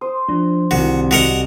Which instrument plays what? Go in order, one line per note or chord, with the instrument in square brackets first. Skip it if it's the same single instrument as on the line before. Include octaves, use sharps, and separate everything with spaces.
[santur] C5 [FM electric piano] D#6
[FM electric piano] F3 D4
[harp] C2 [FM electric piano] D#3 C4 E4 [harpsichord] F#4
[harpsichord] F#4 A#4 F#5 [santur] D#5